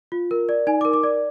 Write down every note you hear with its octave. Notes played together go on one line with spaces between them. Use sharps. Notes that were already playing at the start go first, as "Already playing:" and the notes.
F4
A#4
D5
D#4 G#5
D6
A#4
D6
D5